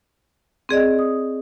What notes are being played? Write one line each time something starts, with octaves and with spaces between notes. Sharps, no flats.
C4 G#4 D5 D#5
D#6